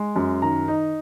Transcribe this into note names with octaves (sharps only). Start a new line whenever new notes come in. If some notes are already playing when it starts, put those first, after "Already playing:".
Already playing: G#3
F#2
D#3 A#5
D#4